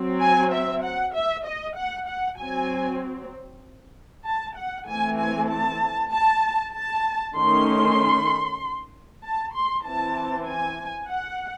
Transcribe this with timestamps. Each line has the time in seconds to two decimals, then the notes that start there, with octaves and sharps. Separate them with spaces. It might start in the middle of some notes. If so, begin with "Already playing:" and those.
Already playing: F#3 C4
0.21 G#5
0.52 E5
0.83 F#5
1.14 E5
1.45 D#5
1.75 F#5
2.07 F#5
2.38 F#3 C4 G#5
4.25 A5
4.56 F#5
4.87 E3 A3 C4 G#5
5.18 G#5
5.49 A5
6.12 A5
6.73 A5
7.35 D#3 A3 C#4 C6
9.23 A5
9.54 C6
9.85 E3 C4 A5
10.47 G#5
11.09 F#5